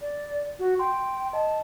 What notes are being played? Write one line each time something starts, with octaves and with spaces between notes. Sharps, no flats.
D5
F#4
G5 C6
D#5 A5